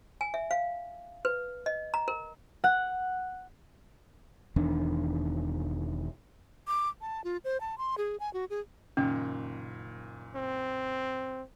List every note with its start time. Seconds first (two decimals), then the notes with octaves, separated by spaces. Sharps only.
0.21 G#5
0.34 E5
0.51 F5
1.25 B4
1.66 D#5
1.94 A#5
2.08 A#4
2.64 F#5
4.56 E1 E2 D#3 D4
6.68 D6
7.01 A5
7.24 F4
7.44 C5
7.61 A5
7.78 C6
7.98 G#4
8.20 G#5
8.34 F#4
8.50 G#4
8.97 F#1 A#2 D#3 C#4
10.35 C4